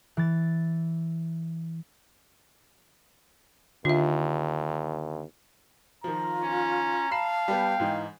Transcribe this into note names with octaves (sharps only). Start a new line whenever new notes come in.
E3 A6
D#2 D3 F4 E5
D#3 F3 F4 A#5
C#4
F5 A5 B5 C7 E7
G3 B3 G5
G#2 E3 D#4